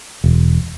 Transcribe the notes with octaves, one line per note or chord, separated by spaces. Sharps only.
E1